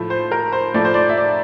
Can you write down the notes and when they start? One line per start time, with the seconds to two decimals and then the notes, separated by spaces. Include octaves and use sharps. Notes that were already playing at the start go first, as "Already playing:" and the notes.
Already playing: A2 F3 A3
0.10 C5
0.31 A#4
0.53 C5
0.74 A2 F3 A3 D5
0.85 C5
0.94 D5
1.09 E5
1.18 D5